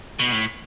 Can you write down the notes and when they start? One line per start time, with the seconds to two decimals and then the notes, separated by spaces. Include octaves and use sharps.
0.19 B2
0.32 A2